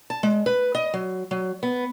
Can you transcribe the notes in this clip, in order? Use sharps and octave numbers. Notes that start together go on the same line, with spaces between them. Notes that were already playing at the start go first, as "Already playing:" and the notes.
A5
G#3
B4
D#5
F#3
F#3
B3